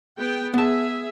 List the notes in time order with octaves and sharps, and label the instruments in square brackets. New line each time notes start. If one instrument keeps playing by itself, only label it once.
[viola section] B3 G#4 G5
[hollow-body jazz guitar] B3 A5 [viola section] G#4 E5